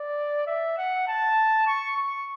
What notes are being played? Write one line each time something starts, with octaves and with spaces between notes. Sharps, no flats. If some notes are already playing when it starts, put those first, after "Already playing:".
Already playing: D5
E5
F#5
A5
C#6
C#6